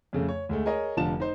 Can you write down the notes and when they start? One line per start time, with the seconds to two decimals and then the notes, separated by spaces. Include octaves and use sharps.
0.13 F2 C#3 A3
0.29 C#5
0.49 D2 G#3 A3
0.66 G#4 A#4 C#5 D#5
0.97 F1 D3 F3 A5 E7
1.20 D#4 C5